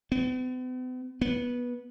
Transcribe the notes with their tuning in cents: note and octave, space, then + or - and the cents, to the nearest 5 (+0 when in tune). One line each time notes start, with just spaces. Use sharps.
B3 +45
B3 -15